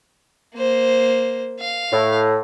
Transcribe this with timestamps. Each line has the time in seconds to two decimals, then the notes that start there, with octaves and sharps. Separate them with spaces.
0.55 A#3 C5
1.60 F5
1.92 A2